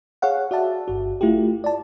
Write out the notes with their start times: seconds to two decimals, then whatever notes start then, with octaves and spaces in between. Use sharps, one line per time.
0.22 G#4 C#5 F5 F#5
0.51 F#4 D5 E5 A5
0.88 G1 F#4
1.21 A3 E4 F4 G4
1.64 D5 A5